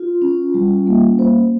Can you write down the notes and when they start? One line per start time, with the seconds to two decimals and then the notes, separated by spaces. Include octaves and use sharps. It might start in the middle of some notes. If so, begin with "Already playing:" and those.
Already playing: F4
0.22 C#4
0.54 G3
0.87 A#3
1.19 C5